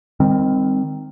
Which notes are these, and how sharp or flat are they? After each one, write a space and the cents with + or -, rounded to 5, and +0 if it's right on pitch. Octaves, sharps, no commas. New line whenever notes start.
D#3 +0 G3 +40 C4 +0